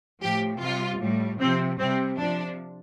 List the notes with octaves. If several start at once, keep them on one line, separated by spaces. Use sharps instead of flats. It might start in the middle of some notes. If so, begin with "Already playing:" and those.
A2 F3 G4
C3 G3 F4
A2 G3
C3 F3 C4
C3 G3 C4
C3 F3 D4